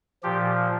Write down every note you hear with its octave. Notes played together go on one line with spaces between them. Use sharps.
A#2 F3 G4